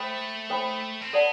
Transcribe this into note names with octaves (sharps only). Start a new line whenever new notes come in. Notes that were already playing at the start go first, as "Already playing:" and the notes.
Already playing: A3 A4 C5 G5 B5
A4 C5 G5 B5
C4
B3 A4 D5 F#5 A5